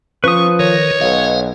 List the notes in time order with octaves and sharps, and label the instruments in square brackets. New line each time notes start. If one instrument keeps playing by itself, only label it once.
[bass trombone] F3 [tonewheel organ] C#4 [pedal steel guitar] B4 D#6 [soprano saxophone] C#6
[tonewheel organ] D#3 A#4 [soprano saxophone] C#5
[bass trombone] B1 [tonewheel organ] D#5 F5